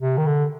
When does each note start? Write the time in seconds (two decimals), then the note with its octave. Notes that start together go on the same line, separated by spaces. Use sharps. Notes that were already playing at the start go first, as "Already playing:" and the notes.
0.01 C3
0.17 D#3
0.26 D3